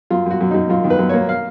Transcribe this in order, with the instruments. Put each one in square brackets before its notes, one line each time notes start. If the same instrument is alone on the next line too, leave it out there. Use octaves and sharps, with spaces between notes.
[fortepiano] F#2 F4
F#2 F#4
F#2
F#2 D#4
F#2 F4
D#3
B4
F#2
A#3 C#5
F5